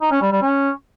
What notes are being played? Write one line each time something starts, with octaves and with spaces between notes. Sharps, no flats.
D#4
C#4
G3
G3
C#4